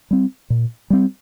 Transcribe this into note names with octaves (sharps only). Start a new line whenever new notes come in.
G3 C4
A#2
G3 C4